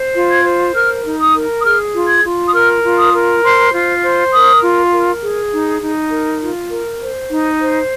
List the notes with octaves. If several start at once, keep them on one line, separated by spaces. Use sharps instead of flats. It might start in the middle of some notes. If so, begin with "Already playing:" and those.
Already playing: C5
F4
G#6
C5
A#4 F6
D#4
D#6
A#4
D#6
G#4 F6
F4
G#6
F4
D#6
A#4 F6
F4
D#6
A#4
C5 C6
F4
C5
A#4 D#6
F4
A#4
G#4
D#4
D#4
A#4
F4
A#4
C5
D#4
C5